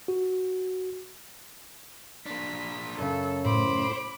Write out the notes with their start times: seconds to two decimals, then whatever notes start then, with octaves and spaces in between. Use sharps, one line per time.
0.08 F#4
2.26 A#3 D4 B6
2.99 F#2 C#3 A4
3.45 A2 C5 B5 D6